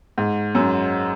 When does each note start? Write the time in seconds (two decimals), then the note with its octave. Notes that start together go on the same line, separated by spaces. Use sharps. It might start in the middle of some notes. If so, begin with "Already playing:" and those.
0.18 G#2
0.55 F#2